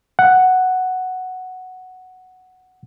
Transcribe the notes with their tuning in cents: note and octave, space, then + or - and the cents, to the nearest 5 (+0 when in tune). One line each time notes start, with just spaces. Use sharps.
F#5 +0